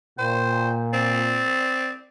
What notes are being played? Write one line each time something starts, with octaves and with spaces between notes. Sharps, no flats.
A#2 C5 G5
C4 D5